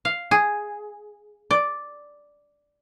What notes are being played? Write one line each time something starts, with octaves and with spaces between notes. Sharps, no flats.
F5
G#4
D5